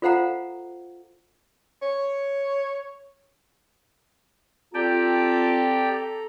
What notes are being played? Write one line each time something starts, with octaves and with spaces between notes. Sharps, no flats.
F4 A4 C5 F5 F#5 A#5
C#5
C4 F4 G4 A4 D5 G5 A5 A#5